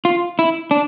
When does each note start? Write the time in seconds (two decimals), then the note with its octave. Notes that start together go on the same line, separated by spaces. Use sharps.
0.05 F4
0.39 E4
0.71 D4